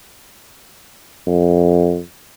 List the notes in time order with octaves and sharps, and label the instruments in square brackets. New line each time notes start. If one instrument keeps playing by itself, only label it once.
[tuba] F2